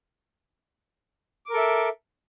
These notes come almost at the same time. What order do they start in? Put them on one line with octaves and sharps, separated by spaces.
D6 A#4 A4 E5